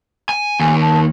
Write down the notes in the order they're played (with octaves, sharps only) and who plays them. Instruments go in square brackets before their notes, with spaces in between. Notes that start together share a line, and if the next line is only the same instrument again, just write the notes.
[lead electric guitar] G#5
[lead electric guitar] D#2 [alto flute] G#5
[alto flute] A5